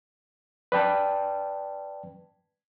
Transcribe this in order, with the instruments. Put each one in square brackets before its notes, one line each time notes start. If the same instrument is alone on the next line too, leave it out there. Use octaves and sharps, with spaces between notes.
[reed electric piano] B4 D5 G5 A5